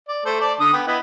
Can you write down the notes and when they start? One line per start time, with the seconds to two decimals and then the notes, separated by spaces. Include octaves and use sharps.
0.08 D5
0.25 A3 A4 C5
0.41 D5 A5
0.60 D3 D#6
0.73 B3 G5
0.87 B3 E4 D#5